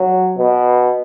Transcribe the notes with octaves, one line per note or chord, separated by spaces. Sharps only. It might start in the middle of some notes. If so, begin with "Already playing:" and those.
Already playing: F#3
B2